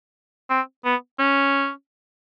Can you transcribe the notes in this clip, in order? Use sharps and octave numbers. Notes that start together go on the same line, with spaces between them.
C4
B3
C#4